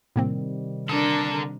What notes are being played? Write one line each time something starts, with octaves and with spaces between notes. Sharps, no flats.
A2 C3 D#3 G3 A#3 C4
D3 D4 A4 A#4 D#6